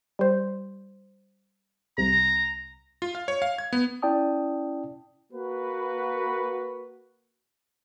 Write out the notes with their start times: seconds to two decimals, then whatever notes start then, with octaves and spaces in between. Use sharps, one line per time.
0.19 G3 C5
1.98 C2 C3 A#5
3.02 F4
3.15 F5
3.28 C#5
3.42 F5
3.58 G#6
3.73 B3
4.02 C#4 E4 D5 G5 A5 D#6
5.32 A#3 F#4 B4